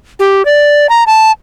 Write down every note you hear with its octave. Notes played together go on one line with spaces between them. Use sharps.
G4
D5
A#5
A5